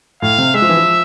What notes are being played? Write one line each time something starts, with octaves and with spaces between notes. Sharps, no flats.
A2 F5
C3
G#3 E5
F3
E3
F3